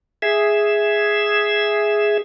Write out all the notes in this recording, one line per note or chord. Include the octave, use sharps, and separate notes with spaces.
G#4 E5